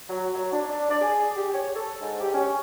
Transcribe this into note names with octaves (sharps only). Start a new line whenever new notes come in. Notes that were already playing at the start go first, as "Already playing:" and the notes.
F#3
F#3
D4
D4
D5
G#4
G4
C#5
A4
G#2
G4
C#4